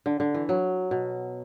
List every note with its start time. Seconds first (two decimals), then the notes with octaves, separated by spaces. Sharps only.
0.06 D3
0.20 D3
0.34 E3
0.49 F#3
0.91 B2